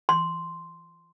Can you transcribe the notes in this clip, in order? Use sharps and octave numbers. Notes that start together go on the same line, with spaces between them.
C6